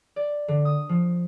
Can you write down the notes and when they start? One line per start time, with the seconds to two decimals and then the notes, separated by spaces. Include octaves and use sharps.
0.16 D5
0.48 D3
0.65 D#6
0.89 F3